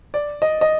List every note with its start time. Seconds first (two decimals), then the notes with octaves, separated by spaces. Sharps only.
0.14 D5
0.42 D#5
0.61 D#5